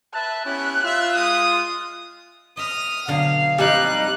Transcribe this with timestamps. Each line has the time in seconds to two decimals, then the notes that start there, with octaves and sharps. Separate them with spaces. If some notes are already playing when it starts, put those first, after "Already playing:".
0.14 B4 E5 A5 F#6
0.45 B3 C#4 E4 G4
0.84 F4 E5
1.14 G#3 D#6
2.57 D#5 E5 D#6 F6
3.08 B2 D3 F#3 F5
3.58 F3 G3 C4 D#4 E4 F#6